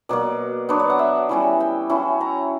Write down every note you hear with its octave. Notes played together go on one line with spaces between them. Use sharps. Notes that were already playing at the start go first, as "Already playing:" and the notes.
B2 F#3 A#3 D5
F#3 B3 D4 C#5
D5
F#5
E5
E3 G3 C#4 E4
G5
F#3 C#4 E4
A#5